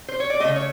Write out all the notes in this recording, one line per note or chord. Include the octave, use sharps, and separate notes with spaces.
C5
C#5
D5
C#3 F#3 A3 D#5
C#5